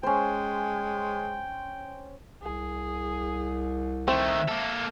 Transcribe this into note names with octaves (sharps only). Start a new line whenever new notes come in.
G#3 C#4 C5 G5
C2 G#4
D#3 A3 C4 E5
A#3 A4